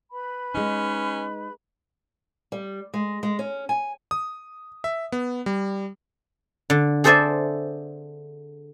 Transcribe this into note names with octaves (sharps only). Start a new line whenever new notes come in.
B4 B5
G#3 C#4 D#4
G3
G#3
G#3
C#4
G#5
D#6
E5
B3
G3
D3
G#4 A4 C5 D5 E5 G#5